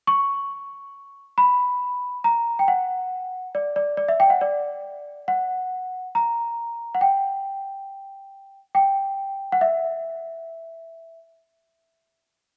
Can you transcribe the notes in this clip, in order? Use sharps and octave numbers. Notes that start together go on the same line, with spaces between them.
C#6
B5
A#5
G5
F#5
D5
D5
D5
E5
G5
F#5
D5
F#5
A#5
F#5
G5
G5
F#5
E5